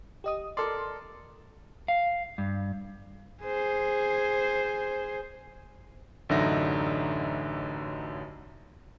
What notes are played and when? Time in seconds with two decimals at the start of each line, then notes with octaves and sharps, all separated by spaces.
0.24 G4 D#5 D#6
0.57 A4 A#4 D5 C6
1.88 F5
2.38 G2
3.43 G#4 C5
6.29 A1 F#2 D3 D#4 E5 A#6